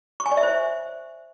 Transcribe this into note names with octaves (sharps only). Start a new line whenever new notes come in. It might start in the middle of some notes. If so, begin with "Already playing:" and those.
C#6
G#5
D5
E5
C5